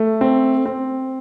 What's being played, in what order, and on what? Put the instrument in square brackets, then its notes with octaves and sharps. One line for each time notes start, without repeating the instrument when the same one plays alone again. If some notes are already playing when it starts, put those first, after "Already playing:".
Already playing: [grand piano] A3
C4
C4